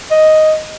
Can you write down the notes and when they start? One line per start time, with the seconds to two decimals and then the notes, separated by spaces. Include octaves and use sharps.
0.11 D#5